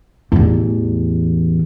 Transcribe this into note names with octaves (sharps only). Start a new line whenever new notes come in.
A1 E2